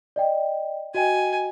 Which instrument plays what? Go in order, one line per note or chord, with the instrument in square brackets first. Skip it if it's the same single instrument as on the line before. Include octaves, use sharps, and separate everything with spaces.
[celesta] D5 D#5 G5
[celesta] F#4 D#5 G5 [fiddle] G#5